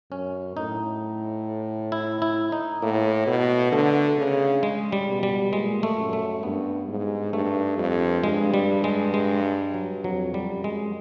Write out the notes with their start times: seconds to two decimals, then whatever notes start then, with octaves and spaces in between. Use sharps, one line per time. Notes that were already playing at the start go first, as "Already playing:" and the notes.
0.11 F#2 C#4
0.57 A2 D#4
1.92 E4
2.22 E4
2.52 D#4
2.82 A2 A#3
3.27 B2
3.72 D3 A3
4.18 C#3
4.63 G#3
4.92 G3
5.08 B2
5.23 G3
5.53 A#2 G#3
5.83 A3
5.97 F#2
6.13 A3
6.43 G2 B3
6.89 G#2
7.33 G2 A3
7.78 F2
8.24 G2 G#3
8.54 G3
8.84 G#3
9.14 G#3
9.74 F#3
10.04 F2 F#3
10.34 G3
10.49 F#2
10.64 G#3